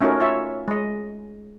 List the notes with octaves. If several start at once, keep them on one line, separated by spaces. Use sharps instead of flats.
A3 C#4 D#4 F4 F#4 A#4
F4 C#5 E5
G#3 D#5